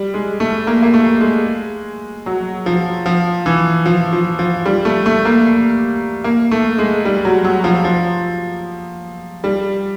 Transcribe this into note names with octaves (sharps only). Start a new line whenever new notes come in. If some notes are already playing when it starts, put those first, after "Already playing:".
Already playing: G3
G#3
A3
A#3
A#3
A3
G#3
F#3
F3
F3
E3
F3
F3
F3
G3
A3
A3
A#3
A#3
A3
G#3
G3
F#3
F#3
F3
F3
G3